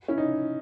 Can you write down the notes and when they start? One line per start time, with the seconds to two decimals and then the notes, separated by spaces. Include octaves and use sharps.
0.08 C#4 E4
0.18 D#4